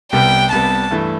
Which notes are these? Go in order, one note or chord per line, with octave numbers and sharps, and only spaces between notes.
C2 C3 G3 B3 G5
C2 C3 G3 B3 A5
G2 E3 A3 E4